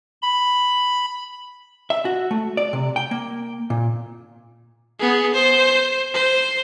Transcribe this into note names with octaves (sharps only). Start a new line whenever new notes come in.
B5
E5
F#4
A3
D5
C3
G5
A#3
A#2
B3 G#4
C5
C5